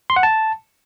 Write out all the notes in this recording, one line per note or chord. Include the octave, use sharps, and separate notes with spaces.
C6
F#5
A5